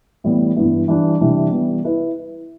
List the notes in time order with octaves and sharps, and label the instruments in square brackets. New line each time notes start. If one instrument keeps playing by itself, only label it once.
[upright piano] A2 E3 G3 B3
G2 E3 B3 E4
E3 G3 D4
C3 E3 G3 D4
E3 G3 B3
E4 B4